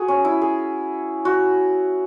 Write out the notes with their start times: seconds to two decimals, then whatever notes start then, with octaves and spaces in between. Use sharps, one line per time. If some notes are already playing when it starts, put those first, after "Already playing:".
Already playing: F#4 G#4
0.08 C#4
0.25 E4
0.41 G#4
1.25 F#4